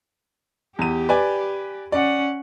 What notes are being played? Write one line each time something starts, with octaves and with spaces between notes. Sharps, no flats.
E2 G4 D#7
B4 D5 G#5
C#4 D5 F#5